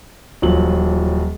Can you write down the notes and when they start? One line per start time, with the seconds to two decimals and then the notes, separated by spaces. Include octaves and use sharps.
0.42 D#1 F3 F#3 F#7